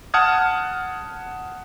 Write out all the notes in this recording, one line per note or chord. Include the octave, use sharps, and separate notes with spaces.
F#5 A5 D#6 F6 G#6